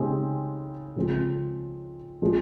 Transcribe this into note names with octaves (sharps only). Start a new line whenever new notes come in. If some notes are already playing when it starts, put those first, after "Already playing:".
Already playing: C#3 G#3 C4 D#4 G4
C#3 F3 G#3 C4
F3 G#3 C4